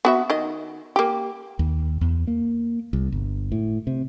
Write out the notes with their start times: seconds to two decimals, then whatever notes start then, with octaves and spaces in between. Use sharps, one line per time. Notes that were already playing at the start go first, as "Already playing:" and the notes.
0.05 B3 F#4 E5
0.30 D#3 D#5
0.96 A#3 G4
1.59 D#2
2.01 E2
2.27 A#3
2.93 C2
3.12 G1
3.52 A2
3.87 C3